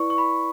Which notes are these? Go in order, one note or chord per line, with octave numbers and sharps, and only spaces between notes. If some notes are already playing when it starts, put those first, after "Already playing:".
Already playing: E4 B4 D5 C#6
C#6
B5